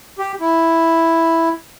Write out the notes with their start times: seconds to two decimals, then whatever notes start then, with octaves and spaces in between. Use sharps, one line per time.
0.19 G4
0.40 E4